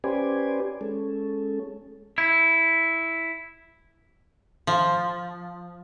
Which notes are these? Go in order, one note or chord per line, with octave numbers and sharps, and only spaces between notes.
C#4 G4 B4 C5 D5 G#5
G#3 C#4 A4
E4
F3